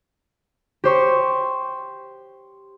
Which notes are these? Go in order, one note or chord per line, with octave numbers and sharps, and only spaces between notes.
G4 C5 C#6